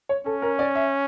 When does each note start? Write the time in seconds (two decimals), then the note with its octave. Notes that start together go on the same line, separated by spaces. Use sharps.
0.09 C#5
0.26 C#4 A4
0.42 A#4
0.59 D5
0.75 E5